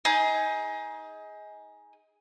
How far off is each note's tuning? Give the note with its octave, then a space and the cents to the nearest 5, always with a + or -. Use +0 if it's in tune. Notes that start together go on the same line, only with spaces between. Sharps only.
D#4 +25 G#4 +0